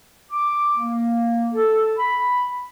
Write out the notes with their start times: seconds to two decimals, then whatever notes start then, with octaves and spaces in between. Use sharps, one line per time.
0.31 D6
0.78 A#3
1.53 A4
1.97 B5